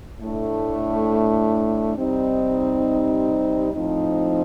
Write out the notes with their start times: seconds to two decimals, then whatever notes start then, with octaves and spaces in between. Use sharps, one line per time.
0.20 A2 A3 D4
1.97 C3 G3 C4 D#4
3.73 A2 F3 C4 D#4